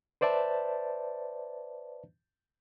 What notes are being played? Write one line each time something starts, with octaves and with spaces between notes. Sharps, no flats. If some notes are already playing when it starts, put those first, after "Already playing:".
B4 C5 D5 E5 A5